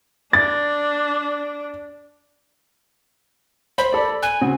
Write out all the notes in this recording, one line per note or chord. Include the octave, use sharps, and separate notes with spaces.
D4 A6
C5 B5
A4 D5
G#5 F#6
C#3 C4 F#4